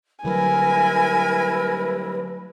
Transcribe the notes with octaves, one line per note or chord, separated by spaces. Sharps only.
D3 F#3 G3 E4 A#4 B4 G#5 B5